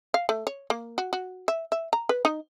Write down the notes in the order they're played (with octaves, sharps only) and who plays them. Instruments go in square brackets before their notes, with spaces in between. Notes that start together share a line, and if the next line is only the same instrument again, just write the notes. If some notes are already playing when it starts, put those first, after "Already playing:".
[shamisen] F5
A3
C#5
A#3
F#4
F#4
E5
E5
A#5
B4
D#4